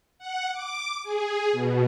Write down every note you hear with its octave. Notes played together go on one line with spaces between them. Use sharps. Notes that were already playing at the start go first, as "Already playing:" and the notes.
F#5
D6
G#4
B2